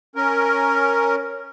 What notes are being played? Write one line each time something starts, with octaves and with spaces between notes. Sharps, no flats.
C#4 A#4